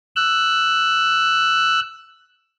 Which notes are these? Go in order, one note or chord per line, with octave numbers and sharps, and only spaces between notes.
E6 F#6